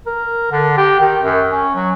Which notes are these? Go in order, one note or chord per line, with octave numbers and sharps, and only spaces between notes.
A#4
D3
G4
D#3
F#2
C#4
F#3